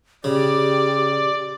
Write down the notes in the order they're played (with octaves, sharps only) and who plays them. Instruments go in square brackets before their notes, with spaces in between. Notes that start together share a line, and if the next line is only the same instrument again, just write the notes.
[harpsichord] C#3 [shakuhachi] G4 [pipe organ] D5